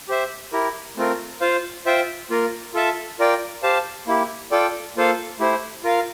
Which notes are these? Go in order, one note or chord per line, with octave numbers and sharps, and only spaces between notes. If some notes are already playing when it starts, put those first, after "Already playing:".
G4 C5 E5
E4 G4 A#4
A3 C4 F4 A#4
F4 C5 F5
F4 C5 E5 G5
A#3 F4 A#4
F4 A4 E5 A5
F4 A#4 D5 G5
G4 C5 F5 A5
A#3 E4 G4
F4 A4 D5 G5
A#3 F4 A4 C5 F5
A3 E4 G4 C5
F4 A#4 F5